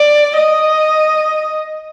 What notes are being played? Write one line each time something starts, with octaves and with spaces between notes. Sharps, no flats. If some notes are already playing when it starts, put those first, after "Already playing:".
Already playing: D5
D#5